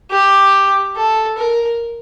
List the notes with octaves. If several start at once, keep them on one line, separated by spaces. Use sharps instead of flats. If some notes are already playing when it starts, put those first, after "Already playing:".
G4
A4
A#4